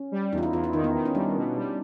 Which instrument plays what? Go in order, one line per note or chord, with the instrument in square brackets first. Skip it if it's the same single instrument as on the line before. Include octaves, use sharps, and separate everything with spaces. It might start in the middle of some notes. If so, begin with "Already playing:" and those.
Already playing: [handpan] C#4
[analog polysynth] G3
[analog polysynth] E2 [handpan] D#4
[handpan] F4
E4
[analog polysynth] E2 [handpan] F4
[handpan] E4
[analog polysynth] D#3 [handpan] D#4
[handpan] B3
[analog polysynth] D#3
[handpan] C#4
[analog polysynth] G3 [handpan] D4
[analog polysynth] B2
G3